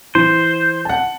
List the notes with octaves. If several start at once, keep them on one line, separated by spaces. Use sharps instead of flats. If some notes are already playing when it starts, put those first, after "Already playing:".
E3 C5
F#5 A5